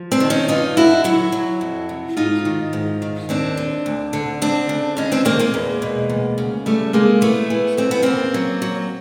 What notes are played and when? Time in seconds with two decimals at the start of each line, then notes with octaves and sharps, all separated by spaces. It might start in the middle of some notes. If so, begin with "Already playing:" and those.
Already playing: F3
0.12 C4 D4
0.20 D#3
0.30 C#4 D#4
0.48 G2 D#4 F4
0.77 D3 E4 F#4
1.04 F#3 E4 F#4
1.32 F#3
1.61 F2
1.89 C3
2.17 G#2 D#4 F4
2.45 D#3
2.73 G#2
3.02 D#3
3.29 D#2 C4 D4
3.57 D3
3.86 D2
4.13 D3
4.42 D2 C4 D4
4.69 C#3
4.97 D#2 C#4 D#4
5.12 C4 D4
5.25 D#3 A#3 C4
5.39 G#3 A#3
5.54 E2
5.82 B2
6.10 D2
6.38 C#3
6.66 E2 G3 A3
6.93 C3 G#3 A#3
7.21 E3 A3 B3
7.50 E3
7.77 F2 C4
7.91 B3
8.03 C#3 A#3 C4
8.34 F#3
8.62 F#3